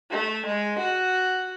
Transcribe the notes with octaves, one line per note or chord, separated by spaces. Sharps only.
A3
G#3
F#4